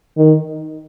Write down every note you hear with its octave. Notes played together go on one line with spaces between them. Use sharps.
D#3